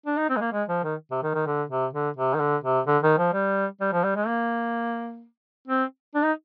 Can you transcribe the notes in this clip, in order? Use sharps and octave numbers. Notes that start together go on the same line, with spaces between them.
D4
D#4
C4
G#3
A#3
G#3
F3
D#3
C3
D#3
D#3
D3
C3
D3
C3
D#3
D3
C3
D3
D#3
F3
G3
G3
F3
G3
G#3
A#3
C4
D4
D#4